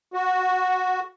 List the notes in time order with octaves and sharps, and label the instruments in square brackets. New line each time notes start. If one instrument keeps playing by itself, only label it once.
[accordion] F#4